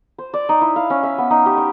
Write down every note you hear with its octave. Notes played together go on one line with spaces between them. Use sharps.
C5
D5
D#4
E4
F5
C#4
E5
B3
D#4
G4
C#6